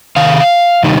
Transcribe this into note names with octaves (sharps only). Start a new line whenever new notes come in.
C3 D#3 F5
C3 D#3 G3 D#4